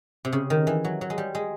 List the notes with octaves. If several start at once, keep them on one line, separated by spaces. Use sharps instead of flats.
C3
C#3
D#3
E3
F#3
F#3
G#3
G3
G#3